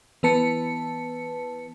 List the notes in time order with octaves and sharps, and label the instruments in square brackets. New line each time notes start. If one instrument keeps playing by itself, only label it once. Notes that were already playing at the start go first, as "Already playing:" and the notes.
[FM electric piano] E3 B3 B4 A5 C#7